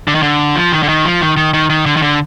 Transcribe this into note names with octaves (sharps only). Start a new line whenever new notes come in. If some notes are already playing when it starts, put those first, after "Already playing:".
D3
D#3
D3
F3
D#3
D3
D#3
F3
D#3
D#3
D#3
D#3
D3
D#3
D3